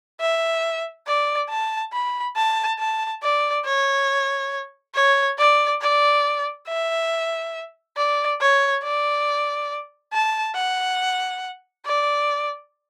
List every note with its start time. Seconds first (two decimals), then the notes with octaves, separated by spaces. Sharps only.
0.20 E5
1.07 D5
1.50 A5
1.93 B5
2.36 A5
2.79 A5
3.23 D5
3.66 C#5
4.95 C#5
5.39 D5
5.81 D5
6.68 E5
7.97 D5
8.41 C#5
8.83 D5
10.13 A5
10.55 F#5
11.86 D5